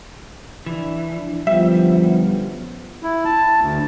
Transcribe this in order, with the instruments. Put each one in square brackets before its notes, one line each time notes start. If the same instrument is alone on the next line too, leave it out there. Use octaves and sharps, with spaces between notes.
[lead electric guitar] E3 [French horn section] D4 E4
[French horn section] F#2 D3 B3 [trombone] F3 [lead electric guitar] G3 [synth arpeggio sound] E5
[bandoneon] E4
A5
D2